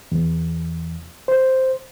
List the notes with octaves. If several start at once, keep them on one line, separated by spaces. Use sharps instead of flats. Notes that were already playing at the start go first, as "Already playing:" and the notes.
E2
C5